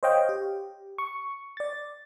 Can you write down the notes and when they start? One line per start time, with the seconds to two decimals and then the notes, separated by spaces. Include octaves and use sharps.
0.03 C5 C#5 D#5 F5 G5
0.29 G4
0.98 C#6
1.57 D5 A6